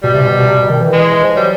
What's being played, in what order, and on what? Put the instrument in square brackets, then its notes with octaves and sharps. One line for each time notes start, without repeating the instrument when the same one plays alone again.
[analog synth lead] B2 [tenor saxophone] G3
[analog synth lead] C3
B2
B2
C3
B2
D#3
E3
[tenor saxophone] G#3
[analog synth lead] E3
F3
[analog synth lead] F#3 [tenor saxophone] G3